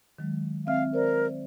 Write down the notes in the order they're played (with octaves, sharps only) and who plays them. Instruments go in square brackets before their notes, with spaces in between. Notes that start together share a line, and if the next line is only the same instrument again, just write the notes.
[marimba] D#3 F#3 G#3
[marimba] C4 E5 F6 [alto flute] F5
[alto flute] A#4 [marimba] C5 D5